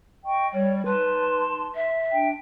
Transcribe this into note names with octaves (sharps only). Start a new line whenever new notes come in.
D#5 G5 C#6
G3 C#5
D#4 B4 A5 C6
E5
D4 G5